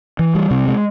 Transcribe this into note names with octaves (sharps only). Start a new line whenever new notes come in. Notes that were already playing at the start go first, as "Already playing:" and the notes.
E3
G3
C3
G#3